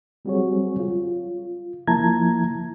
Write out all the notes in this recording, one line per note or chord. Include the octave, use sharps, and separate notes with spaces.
F#3 G3 C4 F#4 G#4 C#5
F4
F3 A#3 E4 A5 A#5 G#6